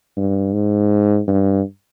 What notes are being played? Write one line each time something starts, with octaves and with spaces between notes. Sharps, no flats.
G2
G#2
G2